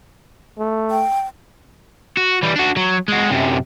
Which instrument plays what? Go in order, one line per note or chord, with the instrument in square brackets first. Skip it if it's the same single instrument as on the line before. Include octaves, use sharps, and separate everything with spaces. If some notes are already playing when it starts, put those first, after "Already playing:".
[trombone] A3
[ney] G5
[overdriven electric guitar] F#4
E3 G3
D4 F#4
F#3
G#3 F#4
F#2 C3